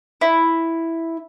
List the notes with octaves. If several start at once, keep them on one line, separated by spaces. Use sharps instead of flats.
E4